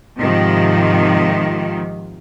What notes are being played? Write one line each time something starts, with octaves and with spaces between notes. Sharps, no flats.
G#2 C3 D#3 F3